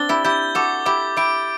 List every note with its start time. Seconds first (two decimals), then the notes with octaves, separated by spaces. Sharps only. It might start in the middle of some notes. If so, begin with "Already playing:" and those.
Already playing: C4 D4 A6 G7
0.09 E4 G4
0.24 E4 G4 G6
0.55 F#4 A4 D6
0.86 E4 G4 D6
1.17 E4 G4 D7